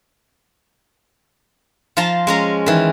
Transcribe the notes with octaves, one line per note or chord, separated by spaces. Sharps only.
F3 F4 C5 A5 A#5
G#3 C#4 A#5
D#3 E3